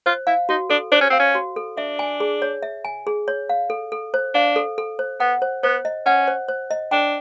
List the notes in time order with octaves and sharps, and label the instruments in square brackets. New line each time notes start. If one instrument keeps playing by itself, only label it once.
[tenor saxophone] F4 [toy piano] C5
[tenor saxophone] E4 [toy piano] F5
[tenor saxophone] D#4 [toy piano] F#4
[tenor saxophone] D4 [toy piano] A4
[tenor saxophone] D4 [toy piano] C5
[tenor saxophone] C#4
[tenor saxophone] C4 [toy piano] F5
[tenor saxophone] C#4
[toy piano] F#4
A4
[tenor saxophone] D4 [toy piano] E5
[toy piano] G#5
G#4
C#5
E5
G#5
G#4
C#5
F5
A4
A4
C5
[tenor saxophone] D4 [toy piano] F5
[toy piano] A4
A4
C5
[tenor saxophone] B3 [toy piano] F#5
[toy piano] C5
[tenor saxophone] B3 [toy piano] C5
[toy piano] D#5
[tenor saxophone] C#4 [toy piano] F#5
[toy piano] C5
C5
D#5
[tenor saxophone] D4 [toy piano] G5